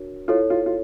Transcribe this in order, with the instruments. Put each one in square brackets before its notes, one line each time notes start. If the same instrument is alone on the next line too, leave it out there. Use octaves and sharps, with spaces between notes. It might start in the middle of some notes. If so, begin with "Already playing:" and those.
Already playing: [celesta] D4 F#4 A#4 C#5
[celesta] E4 A4 C#5 [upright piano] F4
[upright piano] F4
F4